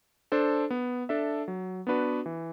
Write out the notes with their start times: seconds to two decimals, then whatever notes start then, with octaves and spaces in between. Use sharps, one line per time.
0.32 D4 A4 C5
0.70 B3
1.09 D4 A4 E5
1.48 F#3
1.87 B3 D4 F#4 B4
2.26 E3